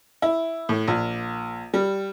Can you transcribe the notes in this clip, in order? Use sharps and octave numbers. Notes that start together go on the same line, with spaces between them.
E4
A2
A#1
G3